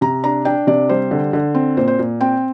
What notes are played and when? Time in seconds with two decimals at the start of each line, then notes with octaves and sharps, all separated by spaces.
0.01 C3 A#5
0.24 D4 A#5
0.45 D4 G5
0.67 C3 D5
0.89 G3 C5
1.11 D3
1.33 D3
1.55 C4
1.77 A#2 C5
1.87 C5
1.99 A#2
2.21 C4 G5